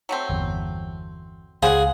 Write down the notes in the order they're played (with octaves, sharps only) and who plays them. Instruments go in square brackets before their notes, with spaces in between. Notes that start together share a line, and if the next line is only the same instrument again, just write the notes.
[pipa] F#3 A3 C4
[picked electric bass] G1 E2
[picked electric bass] C#2 [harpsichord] G#4 [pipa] C5 F#5 [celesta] F5